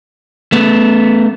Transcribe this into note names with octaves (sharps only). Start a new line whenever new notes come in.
A3 B3